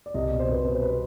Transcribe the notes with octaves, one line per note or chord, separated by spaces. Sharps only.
D5
C2 D#5
B2 D5
C5
C2 B4
C5
B2 B4
C5
B4
C5